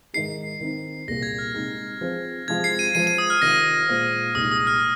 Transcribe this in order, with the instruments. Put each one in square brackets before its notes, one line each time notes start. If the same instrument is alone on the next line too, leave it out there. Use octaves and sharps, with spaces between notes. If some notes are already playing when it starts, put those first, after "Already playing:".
[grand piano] G#2 D#3 G#3 D#4 G#4 [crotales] C7
[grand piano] D#3 C4 D#4
[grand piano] C2 A#2 A#3 G#4 [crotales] A#6
[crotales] G#6
F6
[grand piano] C3 G#3 D#4 G#4
F3 C4 G#4 C5
[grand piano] C3 F3 G#3 C4 F4 [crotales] G#6
[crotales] C7
D#7
[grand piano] F3 G#3 F4 G#4 C5 [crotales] D#7
[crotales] D#7
D#6
F6
[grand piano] C3 D#3 C4 F4 [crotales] A#6
[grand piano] A#2 G#3 F4 C5
[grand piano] C2 A#2 G#3 D#4 [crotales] D#6
[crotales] D#6
F6